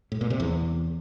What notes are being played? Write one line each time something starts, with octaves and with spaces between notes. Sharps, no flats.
A2
A#2
C3
E2